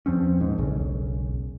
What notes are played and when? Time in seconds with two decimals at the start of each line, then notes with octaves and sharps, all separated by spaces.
0.06 E2 F3 C4 C#4
0.39 D#1 G#2
0.58 E1 B1 C#3